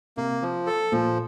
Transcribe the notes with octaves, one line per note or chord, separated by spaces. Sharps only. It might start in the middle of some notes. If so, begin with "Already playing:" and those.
C3 A#3
F3
A4
A#2 F3